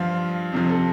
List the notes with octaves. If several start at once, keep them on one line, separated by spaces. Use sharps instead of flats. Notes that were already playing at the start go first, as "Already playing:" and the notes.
Already playing: G2 F3 F4
F2 C3 F3
A4